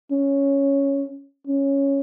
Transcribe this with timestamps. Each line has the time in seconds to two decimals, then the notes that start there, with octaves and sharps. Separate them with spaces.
0.12 C#4
1.47 C#4